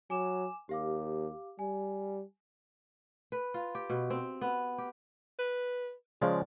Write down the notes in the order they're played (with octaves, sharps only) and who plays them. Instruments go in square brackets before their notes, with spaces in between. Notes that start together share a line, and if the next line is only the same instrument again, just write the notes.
[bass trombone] F#3 [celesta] G#5 D6 E7
[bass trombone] D#2 [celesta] G4 F5 D6
[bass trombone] G3 [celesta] G#5
[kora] B4
F4
G4
B2
C4
B3
G4
[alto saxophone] B4
[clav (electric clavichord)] C#3 F3 G#3 [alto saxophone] D5